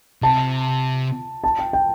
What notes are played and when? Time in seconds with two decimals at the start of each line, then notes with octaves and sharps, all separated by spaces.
0.22 C3 A5
1.44 A5
1.59 G5
1.73 G5